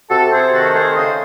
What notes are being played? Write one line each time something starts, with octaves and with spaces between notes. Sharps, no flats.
C3 F#4 A4
C4 G#4 C5
D#3 F#4 A4
A3 G#4 C5
C#3 C5 D#5